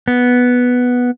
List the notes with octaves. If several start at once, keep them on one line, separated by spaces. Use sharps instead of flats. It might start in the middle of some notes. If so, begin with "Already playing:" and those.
B3